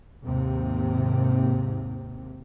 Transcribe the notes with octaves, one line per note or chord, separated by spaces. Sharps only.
D#2 G#2 C3